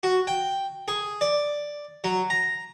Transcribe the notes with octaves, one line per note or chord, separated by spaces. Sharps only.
F#4
G5
G#4
D5
F#3
A#5